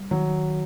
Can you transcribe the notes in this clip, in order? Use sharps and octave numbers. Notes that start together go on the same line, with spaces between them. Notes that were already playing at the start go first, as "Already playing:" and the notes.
Already playing: G3
D#3 F#3